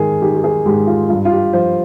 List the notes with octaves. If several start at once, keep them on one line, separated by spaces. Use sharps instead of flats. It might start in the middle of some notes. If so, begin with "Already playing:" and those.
Already playing: G#2 D#3 G#4 A#4
D#3 G4
G4
G#4
G#2 G4
F4
G2 F4
F4
G4
F3 C5